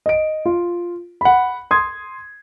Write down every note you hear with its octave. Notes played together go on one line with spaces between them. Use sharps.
D#5 D7
F4
F#5 B5
C6 D#6 G#6